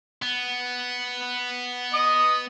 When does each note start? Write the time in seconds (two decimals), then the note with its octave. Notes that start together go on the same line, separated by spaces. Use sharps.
0.22 B3
1.94 D#5 D#6